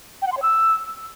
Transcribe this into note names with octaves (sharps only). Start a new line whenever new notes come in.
G5
F#5
C6
C#5
E6